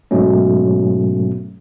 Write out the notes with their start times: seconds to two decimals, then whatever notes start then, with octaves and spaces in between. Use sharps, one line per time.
0.11 G#2 B2 F#3 A3 C#4